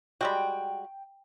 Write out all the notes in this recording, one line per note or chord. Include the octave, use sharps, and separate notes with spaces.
G3 G#3 F#4 G5